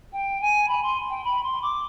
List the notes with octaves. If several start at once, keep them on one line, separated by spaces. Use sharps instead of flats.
G5
G#5
B5
C6
G5
B5
C6
D6